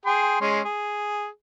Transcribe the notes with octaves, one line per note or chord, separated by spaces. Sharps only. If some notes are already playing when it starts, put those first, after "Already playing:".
G#4 G5 C6
G#3 C#4 C6
G#4